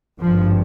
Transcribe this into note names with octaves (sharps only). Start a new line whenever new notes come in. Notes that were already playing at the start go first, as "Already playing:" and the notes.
G#1 G2 F3